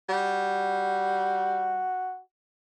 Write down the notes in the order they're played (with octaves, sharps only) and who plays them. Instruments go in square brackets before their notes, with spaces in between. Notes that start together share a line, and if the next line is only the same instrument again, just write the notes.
[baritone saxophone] G3 [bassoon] F#4